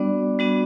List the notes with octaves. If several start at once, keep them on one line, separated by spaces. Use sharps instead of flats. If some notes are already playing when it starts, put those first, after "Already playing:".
Already playing: G3 B3 D4 F#4 D5
G3 B3 D4 F#4